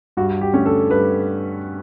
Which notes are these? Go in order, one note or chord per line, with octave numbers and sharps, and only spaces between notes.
G2 F#4
G4
D3 A3 C#4
A4
G2 B4